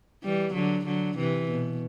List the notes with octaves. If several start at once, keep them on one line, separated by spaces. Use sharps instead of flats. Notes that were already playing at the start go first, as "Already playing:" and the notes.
E3 G3
D3 F#3
D3 F#3
C3 E3
B2